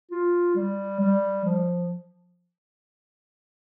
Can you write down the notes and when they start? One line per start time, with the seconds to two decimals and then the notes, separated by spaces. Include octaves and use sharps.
0.11 F4
0.55 G3
1.00 G3
1.44 F3